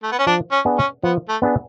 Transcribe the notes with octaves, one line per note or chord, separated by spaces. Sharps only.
A3
B3
C#4
F3 D4
C#4
B3 D4 G#4
C#4
F3 B3
A3
B3 D4 G#4